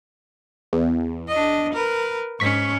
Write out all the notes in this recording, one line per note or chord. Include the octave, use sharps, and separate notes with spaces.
E2
D4 D#5
A#4 B4
G#2 C#4 C#6 B6